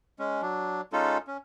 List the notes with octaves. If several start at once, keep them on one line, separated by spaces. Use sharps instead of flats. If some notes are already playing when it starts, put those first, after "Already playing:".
G#3 C#4
F#3 D4
G#3 C#4 D#4 F4 A4
C#4